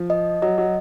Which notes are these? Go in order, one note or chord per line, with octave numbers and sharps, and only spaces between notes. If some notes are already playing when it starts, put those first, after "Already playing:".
Already playing: F3
D#5
F#3 D#5
F#3